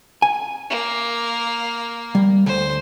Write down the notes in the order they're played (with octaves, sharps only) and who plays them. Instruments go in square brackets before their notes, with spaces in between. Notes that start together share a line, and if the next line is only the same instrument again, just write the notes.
[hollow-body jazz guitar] G#5
[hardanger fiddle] A#3
[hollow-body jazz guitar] G3
[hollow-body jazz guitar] D2 [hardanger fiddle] C5